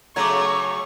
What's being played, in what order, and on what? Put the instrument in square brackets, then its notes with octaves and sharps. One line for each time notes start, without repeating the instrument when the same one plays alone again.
[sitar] C#3 F#3 A3 [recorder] A#5 [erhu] C#6 [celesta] D6 G#6